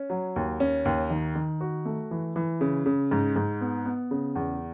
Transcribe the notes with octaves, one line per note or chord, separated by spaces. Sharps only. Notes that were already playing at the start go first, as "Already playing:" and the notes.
Already playing: C#4
F#3
D#2
C#4
D#2
D#3
D#3
F#4
A3
E3
E3
C#3
C#3
G#2
G#2
B3
B3
C#3
E2